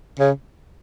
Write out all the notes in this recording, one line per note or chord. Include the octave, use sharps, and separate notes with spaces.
C#3